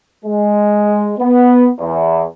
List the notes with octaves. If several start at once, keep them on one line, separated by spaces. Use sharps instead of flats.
G#3
B3
E2